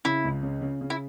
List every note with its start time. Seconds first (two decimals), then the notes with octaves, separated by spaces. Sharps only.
0.05 C#3 E4
0.24 C#2
0.43 C#3
0.61 C#3
0.81 C#3
0.90 E4